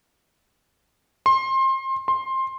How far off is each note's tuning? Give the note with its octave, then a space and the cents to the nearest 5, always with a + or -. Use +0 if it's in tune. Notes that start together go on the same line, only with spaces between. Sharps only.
C6 +25
C6 +15